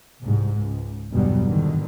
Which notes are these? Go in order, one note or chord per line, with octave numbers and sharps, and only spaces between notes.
C2 G#2
C#2
G1 E2 B2 F#3 G3
E2 G#2 B2 D3 D#3